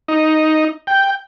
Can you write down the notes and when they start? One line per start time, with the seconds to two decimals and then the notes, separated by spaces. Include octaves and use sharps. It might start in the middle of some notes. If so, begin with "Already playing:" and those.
0.08 D#4
0.87 G5